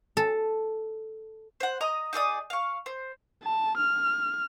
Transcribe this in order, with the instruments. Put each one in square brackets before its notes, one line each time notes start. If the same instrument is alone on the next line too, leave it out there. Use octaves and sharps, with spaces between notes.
[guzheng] A4
[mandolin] C5 F#5
D#5 A#5 D#6
D#4 G#4 D5 D#6
F5 C#6
C5
[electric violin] A5
F6